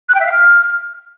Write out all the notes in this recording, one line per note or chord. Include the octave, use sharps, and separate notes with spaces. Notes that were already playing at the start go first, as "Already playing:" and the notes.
F#6
G5
E5
F5
F6